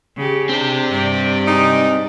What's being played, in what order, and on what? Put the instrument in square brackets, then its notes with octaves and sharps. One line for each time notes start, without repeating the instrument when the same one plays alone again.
[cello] C#3 G4
[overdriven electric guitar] C4 G4 [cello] D4
[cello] G2 D5
[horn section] G#3 D#4